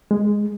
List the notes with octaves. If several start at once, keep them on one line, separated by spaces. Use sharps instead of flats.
G#3